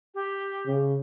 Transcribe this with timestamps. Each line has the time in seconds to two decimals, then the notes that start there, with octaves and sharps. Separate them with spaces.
0.15 G4
0.66 C#3